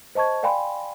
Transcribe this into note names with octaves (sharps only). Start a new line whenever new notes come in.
C5 D#5 A5 C#6 G#6
D5 F5 G5 G#5 B5 C6